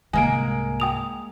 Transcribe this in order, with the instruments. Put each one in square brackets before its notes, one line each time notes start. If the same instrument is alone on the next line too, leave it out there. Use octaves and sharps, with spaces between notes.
[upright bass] C2 G#2 [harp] G#3 A#3 D7 [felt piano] G#5
[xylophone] G5 D#6 F7